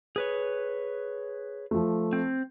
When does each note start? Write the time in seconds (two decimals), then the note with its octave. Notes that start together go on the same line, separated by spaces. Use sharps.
0.16 G#4 B4 C#5
1.71 F3 A3
2.13 C4